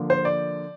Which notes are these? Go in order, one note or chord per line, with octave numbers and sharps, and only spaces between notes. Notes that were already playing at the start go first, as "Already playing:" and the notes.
Already playing: D3 F3 A#3
C5
D5